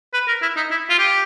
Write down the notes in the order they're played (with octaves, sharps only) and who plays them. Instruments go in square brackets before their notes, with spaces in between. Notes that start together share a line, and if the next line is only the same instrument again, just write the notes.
[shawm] B4
A#4
E4
D#4
E4
F4
G4